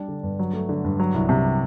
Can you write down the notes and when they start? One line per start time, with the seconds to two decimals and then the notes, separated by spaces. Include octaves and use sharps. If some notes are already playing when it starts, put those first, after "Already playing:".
Already playing: G3 D4
0.08 D3
0.23 G2
0.39 F#3
0.53 A3
0.69 D3
0.84 G2
1.00 F#3
1.14 C2
1.29 C3